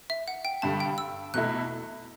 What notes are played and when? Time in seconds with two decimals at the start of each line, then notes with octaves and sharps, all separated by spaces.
0.10 E5
0.28 F#5
0.45 G5
0.62 G2 D3 G3 A5
0.80 G5
0.98 E6
1.34 E2 B2 A3 E4 F#6